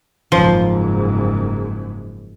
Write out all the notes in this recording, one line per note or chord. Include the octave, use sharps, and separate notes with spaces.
F#1 G#2 F3